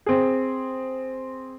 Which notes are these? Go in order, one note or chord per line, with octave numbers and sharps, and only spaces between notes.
C4 G#4